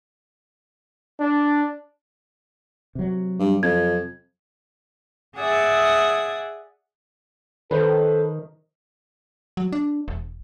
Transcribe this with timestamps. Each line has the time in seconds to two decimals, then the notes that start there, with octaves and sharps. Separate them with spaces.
1.20 D4
2.95 C3 F#3
3.40 G2
3.63 F2 G#6
5.38 G#4 D5 E5 F#5 D#6 G#6
7.71 D#3 A4 B4 C5
9.57 F#3
9.72 D4
10.08 E1